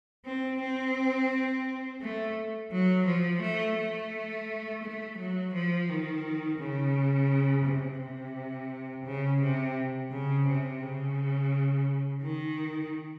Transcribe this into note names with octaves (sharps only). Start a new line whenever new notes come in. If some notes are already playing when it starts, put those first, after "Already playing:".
C4
C4
A3
F#3
F3
A3
A3
A3
F#3
F3
D#3
C#3
C3
C3
C#3
C3
C#3
C3
C#3
D#3